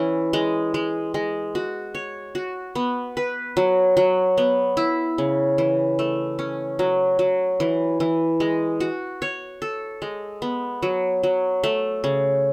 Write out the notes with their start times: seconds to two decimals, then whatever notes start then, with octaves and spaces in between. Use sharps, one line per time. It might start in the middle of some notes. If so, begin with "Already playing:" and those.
Already playing: E3 C#4
0.33 G#3
0.74 G#3
1.14 G#3
1.55 F#4
1.95 C#5
2.35 F#4
2.75 B3
3.17 B4
3.57 F#3
3.97 F#3
4.38 B3
4.77 E4
5.18 C#3
5.58 E3
5.99 A3
6.39 C#4
6.79 F#3
7.19 F#3
7.60 E3
8.00 E3
8.40 G#3
8.80 F#4
9.22 C#5
9.62 A4
10.02 G#3
10.42 B3
10.82 F#3
11.23 F#3
11.64 A3
12.04 C#3